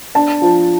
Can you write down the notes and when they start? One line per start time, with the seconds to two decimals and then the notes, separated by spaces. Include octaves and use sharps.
0.15 D4 A5
0.42 F3